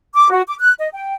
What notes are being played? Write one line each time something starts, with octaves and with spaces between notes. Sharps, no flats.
D6
F#4
D6
F#6
D#5
G5